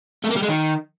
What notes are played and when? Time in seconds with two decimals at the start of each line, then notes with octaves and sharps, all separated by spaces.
0.24 A3
0.30 A#3
0.36 G3
0.42 G#3
0.48 D#3